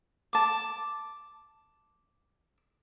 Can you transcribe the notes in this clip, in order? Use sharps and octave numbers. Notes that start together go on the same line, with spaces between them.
A5 D6